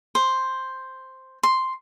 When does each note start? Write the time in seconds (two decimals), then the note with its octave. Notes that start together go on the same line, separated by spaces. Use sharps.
0.15 C5
1.43 C6